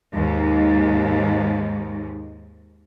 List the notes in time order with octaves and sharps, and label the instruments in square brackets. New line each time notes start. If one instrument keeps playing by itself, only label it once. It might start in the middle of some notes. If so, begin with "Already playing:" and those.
[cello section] D#2 G#2